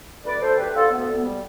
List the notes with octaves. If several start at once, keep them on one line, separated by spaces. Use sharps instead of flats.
D2 B4 D5
D2 A4 C5
D2 G4 B4
D3 F4 A4
D2 B3
D2
B3
G3